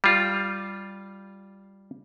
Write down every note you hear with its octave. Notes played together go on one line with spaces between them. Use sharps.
G3 F4